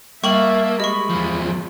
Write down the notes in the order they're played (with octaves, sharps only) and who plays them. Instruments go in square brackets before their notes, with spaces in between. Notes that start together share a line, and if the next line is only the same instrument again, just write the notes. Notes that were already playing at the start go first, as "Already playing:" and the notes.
[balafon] G3 G5 D6 [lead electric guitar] A#3 [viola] E5 A5 [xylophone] C#6 F#7
[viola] G#3 B5 [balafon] G4 [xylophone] D#5 C#6
[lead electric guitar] E2 F3